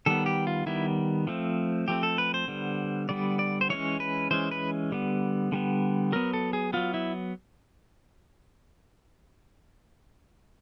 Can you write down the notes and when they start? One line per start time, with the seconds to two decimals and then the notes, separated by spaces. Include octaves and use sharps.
0.06 D#3 G3 B3 A4
0.26 G4
0.47 F4
0.66 D#3 G3 B3 E4
1.27 F3 A3 C4
1.88 F3 A3 C4 G4
2.03 A4
2.18 B4
2.34 C5
2.48 D3 G3 B3
3.09 D3 G3 B3 D5
3.39 D5
3.61 C5
3.69 E3 G#3 C#4 C#5
4.00 B4
4.31 E3 G#3 C#4 C5
4.51 B4
4.92 D3 G3 B3
5.52 D3 G3 B3
6.12 F#3 B3 A#4
6.34 A4
6.53 G#4
6.73 F#3 B3 F4
6.94 E4